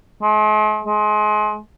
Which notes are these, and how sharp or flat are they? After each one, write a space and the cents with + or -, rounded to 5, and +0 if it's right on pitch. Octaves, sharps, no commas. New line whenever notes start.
G#3 +45
G#3 +30